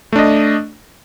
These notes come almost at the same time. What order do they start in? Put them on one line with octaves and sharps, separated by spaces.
A3 D4 D#5